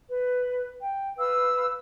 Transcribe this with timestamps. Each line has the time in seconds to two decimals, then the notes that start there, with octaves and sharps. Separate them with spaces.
0.10 B4
0.81 G5
1.17 B4 F5 E6